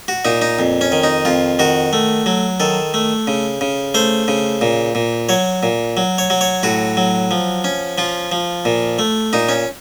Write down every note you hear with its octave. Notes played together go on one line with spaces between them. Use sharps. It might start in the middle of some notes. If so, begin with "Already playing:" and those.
F#4
A#2 D#4
D#4
F2
C#4
D#3
D#4
F2 F4
D#3 F#4
A3
F#3
D#3 A4
A3
C#3
C#3
A3 C5
C#3
A#2
A#2
F#3 C#5
A#2
F#3
C#5
F#3
C#5
A2 F#4
F#3
F3
C#4
F3 F4
F3
A#2
A3
A#2 D#4
C#4